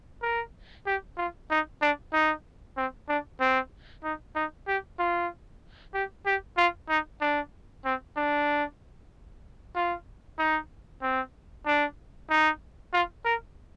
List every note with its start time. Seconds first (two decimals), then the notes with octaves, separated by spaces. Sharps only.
0.22 A#4
0.86 G4
1.17 F4
1.50 D#4
1.82 D4
2.13 D#4
2.77 C4
3.09 D4
3.40 C4
4.04 D#4
4.35 D#4
4.67 G4
4.99 F4
5.94 G4
6.26 G4
6.58 F4
6.89 D#4
7.21 D4
7.85 C4
8.16 D4
9.75 F4
10.39 D#4
11.02 C4
11.66 D4
12.30 D#4
12.93 F4
13.25 A#4